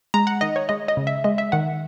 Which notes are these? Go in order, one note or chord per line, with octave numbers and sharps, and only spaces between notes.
G#3 A#5
F#5
D#3 D#5
C#5
G#3 D#5
D#5
C#3
E5
G#3 D#5
E5
D#3 F#5